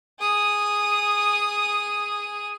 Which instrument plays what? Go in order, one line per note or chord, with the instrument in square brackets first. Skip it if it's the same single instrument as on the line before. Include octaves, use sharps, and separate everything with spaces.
[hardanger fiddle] G#4 D#6